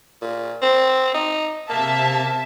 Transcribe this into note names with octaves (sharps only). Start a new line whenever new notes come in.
A#2
C4
D#4
C3 A#3 E5 A5